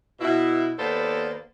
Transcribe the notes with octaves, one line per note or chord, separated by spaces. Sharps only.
B2 E4
D#2 A#3 B3 A4 C5 D5